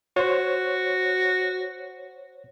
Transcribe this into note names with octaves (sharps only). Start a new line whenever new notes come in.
F#4 C5 C#5